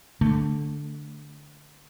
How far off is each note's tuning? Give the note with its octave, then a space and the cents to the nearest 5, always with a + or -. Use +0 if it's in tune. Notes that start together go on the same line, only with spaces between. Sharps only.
D3 +0 A3 +0